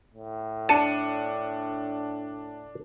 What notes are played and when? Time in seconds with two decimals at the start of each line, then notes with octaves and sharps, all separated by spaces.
0.14 A2
0.69 D4 A5 C#7 D#7